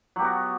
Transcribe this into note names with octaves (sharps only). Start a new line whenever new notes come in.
F#3 B3 F#4 G4